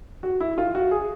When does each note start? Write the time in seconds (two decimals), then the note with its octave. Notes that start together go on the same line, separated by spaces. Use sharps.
0.23 F#4
0.40 E4
0.58 F4
0.75 F#4
0.91 G#4